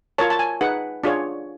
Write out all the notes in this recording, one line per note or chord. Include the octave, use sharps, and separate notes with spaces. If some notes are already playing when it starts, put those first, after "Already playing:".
F4 A#4 C#5 A5
A5
G#5
D#4 G#4 B4 F#5
D4 F4 G#4 C#5